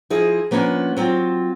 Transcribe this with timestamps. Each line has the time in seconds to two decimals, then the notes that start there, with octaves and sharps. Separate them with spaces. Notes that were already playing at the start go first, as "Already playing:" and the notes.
0.10 F3 E4 G#4 D#5
0.51 F3 A#3 B3 C#4 D4
0.96 F#3 C4 F4